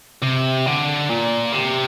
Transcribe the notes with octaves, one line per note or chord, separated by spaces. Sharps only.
C3
D3
A#2
C3